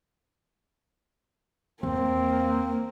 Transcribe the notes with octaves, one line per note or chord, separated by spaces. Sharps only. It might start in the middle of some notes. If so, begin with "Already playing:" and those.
E2 A#3 C4